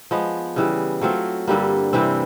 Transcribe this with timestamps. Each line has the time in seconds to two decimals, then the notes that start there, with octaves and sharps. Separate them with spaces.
0.11 F3 G#3 B3
0.56 C#3 E3 G3
1.01 F#3 A3 C4 F4
1.48 G2 D3 G3 A#3
1.93 C3 E3 G3 C4